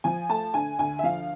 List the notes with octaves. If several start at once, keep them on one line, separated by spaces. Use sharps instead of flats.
F3 G#5
A3 A5
D3 G#5
D2 G#5
E5
F3 F5